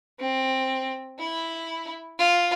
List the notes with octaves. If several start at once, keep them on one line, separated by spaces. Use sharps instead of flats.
C4
E4
F4